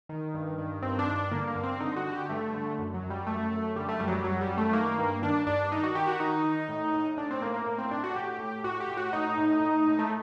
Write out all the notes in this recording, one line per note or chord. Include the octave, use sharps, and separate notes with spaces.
D#3
G2
D#3
G2 C4
D4
G2
D4
D3 A#3
A#3
G2
C4
D3 D#4
F#4
D3
G4
G2 A3
D3
F#2
F#3
F#2
G3
F#2 A3
F#2
D3 G3
A3
F#2 G3
F#3
G3
F#2 F#3
G3
F#2
A3
D#3 A#3
G2
D#3 D4
G2 D4
D#3 D#4
F#4
D#3 G4
F#4
D#3 D#4
D#3
A2
A2
A2 D4
C4
A2 A#3
A#3
A2 A#3
C4
A2 D4
F#4
A2 G4
A2
A2 F#4
G4
A2
F#4
A2 D#4
A2
A2
A2
A3